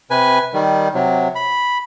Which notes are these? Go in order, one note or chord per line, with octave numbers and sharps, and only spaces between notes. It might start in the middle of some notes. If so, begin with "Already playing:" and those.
C3 B4 G#5
D#3 G3
C3 F#3
B5